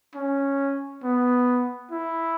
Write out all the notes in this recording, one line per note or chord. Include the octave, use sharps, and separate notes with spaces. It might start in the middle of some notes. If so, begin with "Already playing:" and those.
C#4
B3
E4